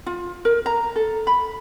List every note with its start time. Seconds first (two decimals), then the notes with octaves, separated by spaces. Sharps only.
0.06 F4
0.45 A#4
0.66 A#5
0.96 A4
1.27 B5